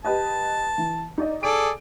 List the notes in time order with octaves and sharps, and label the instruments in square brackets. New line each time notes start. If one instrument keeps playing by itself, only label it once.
[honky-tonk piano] G4 B4 D#5 [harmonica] A5
[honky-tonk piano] E3
D#4 D5 D#5
[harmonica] G#4 A4 D5 [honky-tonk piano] D7